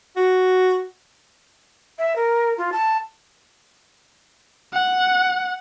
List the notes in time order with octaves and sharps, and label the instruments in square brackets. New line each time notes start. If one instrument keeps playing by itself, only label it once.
[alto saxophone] F#4
[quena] E5
A#4
F4
A5
[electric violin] F#5